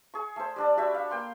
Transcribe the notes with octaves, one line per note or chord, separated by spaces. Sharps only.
G#4 C#6
A3 C5
G3 D4 D5
F#4 G4 E5 B5
F5 C#6
A#3 G5 C6